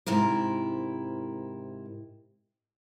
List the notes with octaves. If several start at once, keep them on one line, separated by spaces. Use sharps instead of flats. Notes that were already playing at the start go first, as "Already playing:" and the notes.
G#2 C3 E4 A#4